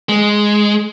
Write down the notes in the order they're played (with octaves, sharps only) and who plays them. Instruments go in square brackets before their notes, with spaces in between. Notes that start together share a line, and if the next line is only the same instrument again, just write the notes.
[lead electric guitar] G#3